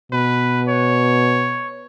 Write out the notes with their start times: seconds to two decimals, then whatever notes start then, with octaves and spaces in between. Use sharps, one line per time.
0.12 B2 B4
0.68 C#5